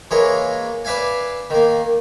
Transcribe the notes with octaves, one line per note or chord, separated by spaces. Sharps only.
E3 G#3 A#3 G#4 C#5
B4 D5 E5 F5 G#5
D#3 A#3